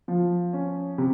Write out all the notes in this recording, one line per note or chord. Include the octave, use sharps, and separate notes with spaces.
F3
C#4
C3